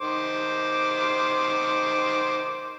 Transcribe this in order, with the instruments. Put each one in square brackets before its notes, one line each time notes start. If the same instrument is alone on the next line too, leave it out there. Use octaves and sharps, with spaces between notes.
[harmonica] D#3 C5 D6